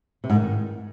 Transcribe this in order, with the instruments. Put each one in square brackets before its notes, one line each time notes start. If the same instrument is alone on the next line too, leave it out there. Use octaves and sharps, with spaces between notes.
[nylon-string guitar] C3
G#2
D#3